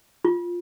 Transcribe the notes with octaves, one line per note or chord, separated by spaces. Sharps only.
F4